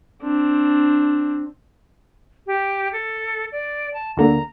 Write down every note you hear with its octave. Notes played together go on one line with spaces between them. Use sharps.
C4 D4
G4
A4
D5
A5
D2 D3 A#3 A#5